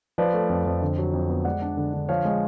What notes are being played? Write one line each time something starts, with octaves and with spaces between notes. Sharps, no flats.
F3 B4 D5
A3
F2
F2
D3
F#3
F2
B3
G#3 D5 F#5
D4
D3
D3
F3 C#5 F5
G#3